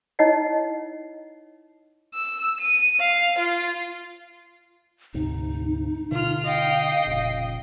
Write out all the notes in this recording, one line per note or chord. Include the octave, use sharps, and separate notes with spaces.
D#4 E4 C#5 D#5 F#5
E6
D#7
F5
F4
D2 G#2 C3 D#4
B2 D3 F4 F6
D#5 F5 G5
F1 A#2 C#3